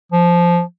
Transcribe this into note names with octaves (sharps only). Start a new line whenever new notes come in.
F3